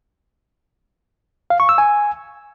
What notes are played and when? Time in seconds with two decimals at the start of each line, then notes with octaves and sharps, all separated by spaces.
1.50 F5
1.60 C#6
1.69 E6
1.78 G#5